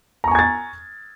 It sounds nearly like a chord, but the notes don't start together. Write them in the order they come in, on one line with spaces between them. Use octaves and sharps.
A#5 C#6 G#5 G#6 A6